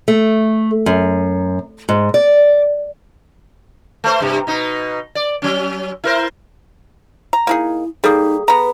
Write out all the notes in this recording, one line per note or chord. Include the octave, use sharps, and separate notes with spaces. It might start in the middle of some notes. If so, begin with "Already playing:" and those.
A3
F#2
G#2
D5
A3 C5
G2 C3
B2 D#4
D5
F#3 C#4
E4 A#4 C5
A#5
A#3 D#4 E4 G#4
G3 A#3 D#4 G#4 A4 D#6
B3 B4 A#5